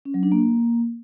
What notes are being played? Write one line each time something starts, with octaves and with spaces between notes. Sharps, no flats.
C#4
F#3
D4
A#3